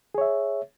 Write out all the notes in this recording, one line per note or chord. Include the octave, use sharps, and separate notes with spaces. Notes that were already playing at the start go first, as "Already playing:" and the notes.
G#4 C#5 E5